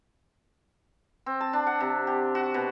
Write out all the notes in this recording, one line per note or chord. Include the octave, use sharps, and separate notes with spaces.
C4
A5
D4
F#5
C3
G4
F#4
B2